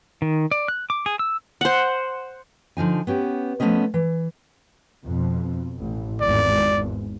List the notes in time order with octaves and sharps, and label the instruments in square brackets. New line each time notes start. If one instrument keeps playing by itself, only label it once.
[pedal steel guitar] D#3
D5
F#6
D6
G#4
E6
[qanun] C5 F#5
[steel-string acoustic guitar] D3 F3 D#4 G#5
B3 C#4 G4
F3 A3 B3 C#4 D#5
E3
[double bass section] F2 B2
A1
[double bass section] G#1 E2 G#2 [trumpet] D5